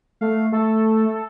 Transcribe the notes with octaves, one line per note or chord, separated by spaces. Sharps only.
A3 F5
A3 A4